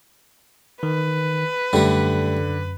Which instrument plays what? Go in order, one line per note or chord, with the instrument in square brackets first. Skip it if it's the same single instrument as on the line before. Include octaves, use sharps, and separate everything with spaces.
[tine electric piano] D#3 [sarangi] B4
[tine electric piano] F#2 [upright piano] D3 [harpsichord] G3 A3